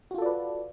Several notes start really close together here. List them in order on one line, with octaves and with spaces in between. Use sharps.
F#4 F4 A4 D5 B4